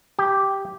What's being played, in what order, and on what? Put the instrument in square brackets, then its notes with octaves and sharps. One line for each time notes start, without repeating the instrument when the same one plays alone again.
[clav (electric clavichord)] G4